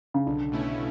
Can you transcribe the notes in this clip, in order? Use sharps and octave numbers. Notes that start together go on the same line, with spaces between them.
C#3
B1 D3
B2 A3 C#4 E4